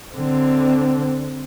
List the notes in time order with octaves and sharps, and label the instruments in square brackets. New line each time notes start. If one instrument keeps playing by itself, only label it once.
[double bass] D3 C4